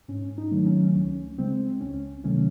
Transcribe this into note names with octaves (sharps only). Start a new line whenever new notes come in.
G#2 C#4
D#4
D#3 F#3 A3
C#4
C#2 C#4
C#3 G#3 C4
C#2 C#4
C3 D#3 F#3 A3 C#4